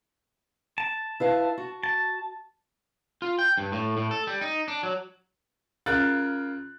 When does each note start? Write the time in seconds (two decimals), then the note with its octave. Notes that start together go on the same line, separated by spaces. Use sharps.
0.78 A5
1.20 E4 B4 F5
1.58 F#4
1.83 A5
3.22 F4
3.39 G5
3.58 G2
3.72 A2
3.97 A2
4.11 A4
4.27 G3
4.41 D#4
4.68 D4
4.83 F#3
5.86 C#3 F4 A#4 F#6 A6